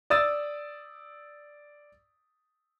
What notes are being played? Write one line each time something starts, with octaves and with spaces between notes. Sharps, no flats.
D5 D#6 E6 A6